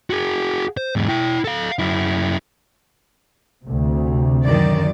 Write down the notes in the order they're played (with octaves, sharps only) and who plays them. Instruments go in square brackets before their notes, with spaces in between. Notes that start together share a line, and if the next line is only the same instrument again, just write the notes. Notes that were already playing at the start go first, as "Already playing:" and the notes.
[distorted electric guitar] F#4 G#4
C5
E2 G#2
E4 G5
A4 F5
F#2 E4
[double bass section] D2 C3
[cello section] F#2 D#3 D5